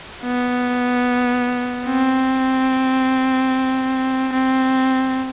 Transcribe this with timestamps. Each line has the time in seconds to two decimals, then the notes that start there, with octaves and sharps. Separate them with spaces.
0.23 B3
1.87 C4
4.33 C4